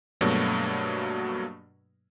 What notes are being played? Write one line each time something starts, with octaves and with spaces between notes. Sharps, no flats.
G2 B2 F#3 A3 A#3 D4